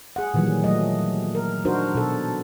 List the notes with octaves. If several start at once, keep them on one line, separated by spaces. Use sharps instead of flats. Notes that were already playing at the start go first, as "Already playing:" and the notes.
G#4 F#5
A#2 D#3 E3 F#3 G3
F#3 A3 D#5
A#4
D4 D#4 F#4 A#4 C5
B2 A4